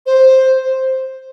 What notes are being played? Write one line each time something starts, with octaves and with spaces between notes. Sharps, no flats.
C5